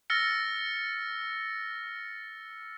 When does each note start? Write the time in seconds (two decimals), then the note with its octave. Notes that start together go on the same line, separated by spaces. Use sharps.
0.10 E6 F6 A6 A#6 C#7